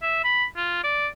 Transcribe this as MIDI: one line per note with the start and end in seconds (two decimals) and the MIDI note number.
0.02 0.21 76
0.24 0.45 83
0.57 0.81 65
0.84 1.07 74